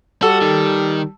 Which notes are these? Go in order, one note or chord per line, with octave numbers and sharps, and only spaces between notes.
G3 F#4 A4
D#3